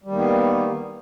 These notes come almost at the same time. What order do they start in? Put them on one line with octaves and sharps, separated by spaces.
G3 D#3 A#3 B3